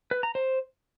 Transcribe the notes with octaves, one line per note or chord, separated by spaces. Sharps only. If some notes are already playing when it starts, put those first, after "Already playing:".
B4
A#5
C5